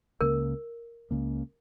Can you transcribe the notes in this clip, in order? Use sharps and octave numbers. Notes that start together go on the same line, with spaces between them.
C#2 C#3 A#3 A#4
C#2 C#3 A#3